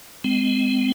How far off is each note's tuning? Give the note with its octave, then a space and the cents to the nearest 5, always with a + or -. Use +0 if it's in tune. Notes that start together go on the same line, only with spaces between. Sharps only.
G#3 -5 C4 -35